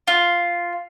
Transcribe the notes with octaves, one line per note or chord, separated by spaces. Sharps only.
F4